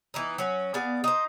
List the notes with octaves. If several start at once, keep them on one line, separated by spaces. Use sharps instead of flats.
E3 B3 D#4
F#3 C#4
B3 G#4 D5 F5
D#4 C5